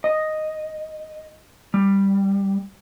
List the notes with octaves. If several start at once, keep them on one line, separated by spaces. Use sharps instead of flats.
D#5
G3